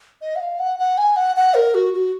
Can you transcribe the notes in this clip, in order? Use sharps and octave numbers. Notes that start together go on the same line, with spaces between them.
D#5
F#5
F5
F#5
F#5
G#5
F#5
F#5
A#4
F#4
F#4